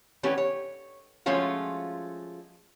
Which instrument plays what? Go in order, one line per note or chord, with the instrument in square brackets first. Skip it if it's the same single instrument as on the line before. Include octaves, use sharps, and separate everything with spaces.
[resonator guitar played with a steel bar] E3 A3 B3 C#4 G4
C#5
F3 G#3 A3 C#4 F4 F#4